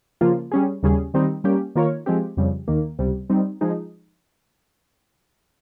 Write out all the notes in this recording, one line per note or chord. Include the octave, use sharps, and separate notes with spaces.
C#3 F3 A#3 F4
G3 C#4 G#4
D#2 C#3 G3 C#4 G#4
D#3 G3 C4 D#4
G3 A#3 C#4 G4
D#3 A#3 F4 A#4 C#5
F3 G#3 C4 G4
F2 C#3 G3
D#2 D#3 A#3
C#2 C3 G3
G3 C4 D#4
F3 G#3 D#4 G#4